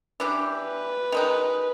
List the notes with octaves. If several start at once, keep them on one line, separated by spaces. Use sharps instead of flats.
E3 D4 G4
B4
D#3 G#3 D#4